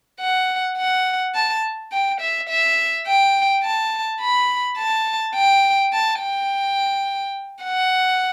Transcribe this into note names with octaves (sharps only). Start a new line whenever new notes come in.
F#5
F#5
A5
G5
E5
E5
G5
A5
B5
A5
G5
A5
G5
F#5